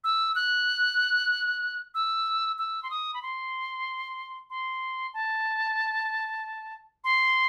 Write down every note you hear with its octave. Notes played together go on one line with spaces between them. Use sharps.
E6
F#6
E6
E6
C6
D#6
B5
C6
C6
A5
C6